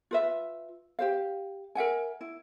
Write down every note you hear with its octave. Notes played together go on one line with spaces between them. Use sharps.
F4 B4 E5
G4 C5 F5
A#4 E5 F#5 G#5
E4